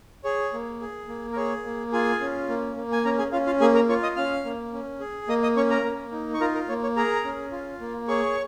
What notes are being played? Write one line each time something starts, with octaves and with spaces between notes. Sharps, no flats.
G#4 C#5
A#3
G#4
A#3
A#4
G#4 C#5
A#3
F4 G#4 G#5
C#4
A#3
A#3
G#5
C#4 A#4 A#5
G#4 G#5
C#4 F4 F5
F4 F5
A#3 G#4 G#5
A#4 A#5
F4 C#5 C#6
D#5 D#6
C#4 F5 F6
A#3
C#4
G#4
A#3 D#5 D#6
D#5 D#6
C#4 C#5 C#6
A#4 A#5
A#3
D#4
C#6
F4 A#4 A#5
A#4
A#3 C#5
C#5
G#4 A#4 A#5
C#4
F4
A#3
G#4 C#5 C#6